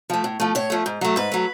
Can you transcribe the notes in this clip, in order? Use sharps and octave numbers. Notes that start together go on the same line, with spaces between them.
F3 A3
A2
F3 A3
A2 C#5
F3 A3
G#2
F#3 A3
G#2 B4
F#3 A3